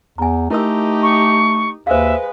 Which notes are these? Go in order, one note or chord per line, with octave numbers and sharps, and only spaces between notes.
E2 G#5 A#5
A3 D#4 E4 G4 A#4 E6
C#6
D#2 G#3 B4 C5 E5 F5